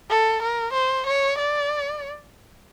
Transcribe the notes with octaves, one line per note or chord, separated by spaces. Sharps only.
A4
A#4
C5
C#5
D5